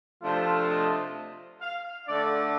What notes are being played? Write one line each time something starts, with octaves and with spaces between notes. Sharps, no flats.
C3 F3 A3 D4 F4 C5
D#5
F5
D3 A3 D4 D5